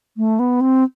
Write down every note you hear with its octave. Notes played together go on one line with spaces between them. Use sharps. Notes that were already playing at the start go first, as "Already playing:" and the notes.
A3
B3
C4